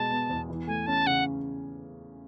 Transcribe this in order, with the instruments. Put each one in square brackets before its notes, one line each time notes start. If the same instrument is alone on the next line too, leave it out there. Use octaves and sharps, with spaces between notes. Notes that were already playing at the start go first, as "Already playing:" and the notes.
Already playing: [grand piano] B2 G#3 [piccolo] A5
[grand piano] B3
E2
E3
[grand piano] A3 [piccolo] G#5
[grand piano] C#4 [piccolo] A5
[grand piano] C#3 [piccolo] F#5